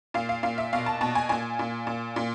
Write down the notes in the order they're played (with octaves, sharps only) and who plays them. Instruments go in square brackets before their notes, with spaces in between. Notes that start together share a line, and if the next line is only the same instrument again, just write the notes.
[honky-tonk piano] A#2 F5
F5
A#2 F5
E5
B2 F5
A5
B2 A5
G#5
A#2 G#5
A#2
A#2
A#2